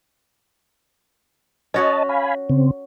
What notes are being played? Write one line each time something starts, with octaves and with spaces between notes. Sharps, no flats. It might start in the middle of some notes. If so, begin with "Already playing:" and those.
C#4 F#4 C#5 D#5 A5
F5 G#5 B5
C#3 C4